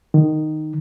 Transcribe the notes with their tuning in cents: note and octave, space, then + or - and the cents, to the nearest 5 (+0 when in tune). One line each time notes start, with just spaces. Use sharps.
D#3 -10